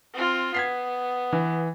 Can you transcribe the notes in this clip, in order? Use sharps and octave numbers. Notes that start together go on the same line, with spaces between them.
C4 F4
B3 G#6 B6 C7
E3